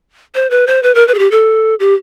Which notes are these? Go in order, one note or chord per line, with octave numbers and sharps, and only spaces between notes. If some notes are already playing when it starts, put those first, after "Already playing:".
C5
B4
C5
B4
A#4
B4
G#4
G4
A4
G4